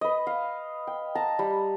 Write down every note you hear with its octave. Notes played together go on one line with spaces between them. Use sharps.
B4 D#5
F5
G5
A5 A#5
G3